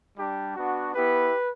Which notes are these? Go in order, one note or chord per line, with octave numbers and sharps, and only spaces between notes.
G3 D4 G4
B3 D4 F#4
B3 E4 G4 B4